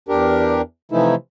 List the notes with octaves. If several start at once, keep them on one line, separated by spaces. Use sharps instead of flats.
E2 D4 G4 A#4
C3 E3 F3 A3 D#4 E4